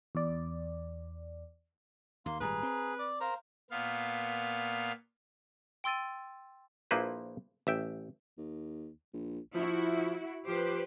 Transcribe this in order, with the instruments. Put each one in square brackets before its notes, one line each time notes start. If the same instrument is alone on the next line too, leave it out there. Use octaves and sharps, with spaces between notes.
[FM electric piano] E2 D5
[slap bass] D#2 [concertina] A#3 C6
[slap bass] G#1 A#2 G3 [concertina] G#4 [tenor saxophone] B4 [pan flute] A#5
[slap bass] C4
[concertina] D5 D6
[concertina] A#4 C5 A#5 [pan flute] F5
[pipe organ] A#2 B3 F5
[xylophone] G5 C6 E6 A6 D#7
[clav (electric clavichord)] A#1 F3 A#3 E4 B4 C5
A1 E5 G5
[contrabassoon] D#2
A#1
[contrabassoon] F3 [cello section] E4 F#4
[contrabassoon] F3 [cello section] G4 B4 C5